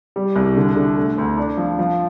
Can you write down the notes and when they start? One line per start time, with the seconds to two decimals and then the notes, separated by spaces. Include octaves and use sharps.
0.16 G3
0.36 C2
0.57 D3
0.76 D3
0.98 A3
1.18 D2
1.38 D4
1.57 F3
1.79 F3